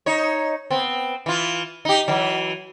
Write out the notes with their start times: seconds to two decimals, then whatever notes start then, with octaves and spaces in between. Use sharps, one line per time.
0.06 D#4 C#5
0.70 B3 C4
1.26 E3 F4
1.85 D#4 G4
2.08 E3 F#3